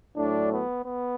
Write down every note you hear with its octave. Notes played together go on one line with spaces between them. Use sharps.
A2 F#3 A3 D4
B3
B3